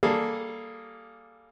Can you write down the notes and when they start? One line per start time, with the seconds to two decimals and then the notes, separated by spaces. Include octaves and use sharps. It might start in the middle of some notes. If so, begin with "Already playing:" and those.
0.03 G3 A#3 G#4 A4